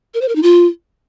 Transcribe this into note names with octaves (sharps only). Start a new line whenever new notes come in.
A#4
C5
A#4
D#4
F4